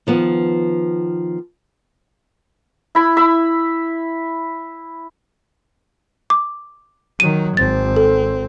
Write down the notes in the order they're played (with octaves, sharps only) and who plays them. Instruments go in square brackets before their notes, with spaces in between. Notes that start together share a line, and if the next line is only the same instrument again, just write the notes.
[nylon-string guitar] D#3 F3 B3
[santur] E4 B5
E5 B5
[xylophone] D6
[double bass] D#3 F#3 [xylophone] D#7
[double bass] G#1 C4 [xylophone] A6
[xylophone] A4